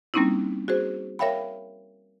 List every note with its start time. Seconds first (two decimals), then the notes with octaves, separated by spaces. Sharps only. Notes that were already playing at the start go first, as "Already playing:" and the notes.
0.14 G3 A#3 C4 C#4 D#4 E4
0.68 F#4 G#4 C5
1.19 A#4 C#5 E5 F5 G5 B5